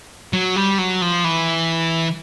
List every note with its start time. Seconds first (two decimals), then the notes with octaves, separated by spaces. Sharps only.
0.33 F#3
0.56 G3
0.79 F#3
1.02 F3
1.24 E3